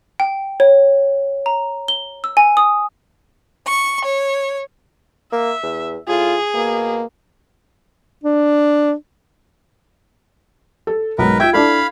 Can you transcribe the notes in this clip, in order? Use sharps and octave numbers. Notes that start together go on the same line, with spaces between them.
G5
C#5
A#5
G7
E6
G#5
D#6
C#6
C#5
A#3 E5
E2
A2 F4 G#4
B2 A#3
D4
A4
B1 G#2 A#4 B4
F4 E5 G5 G#6
D4 E4 A4 F5 B5